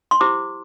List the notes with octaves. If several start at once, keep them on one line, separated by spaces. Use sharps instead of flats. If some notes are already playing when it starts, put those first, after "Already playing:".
C6
E4 G4 C5 D6